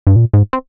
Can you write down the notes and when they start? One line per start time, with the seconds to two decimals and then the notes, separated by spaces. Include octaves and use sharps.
0.07 G2
0.16 A#2
0.33 G#2
0.53 C4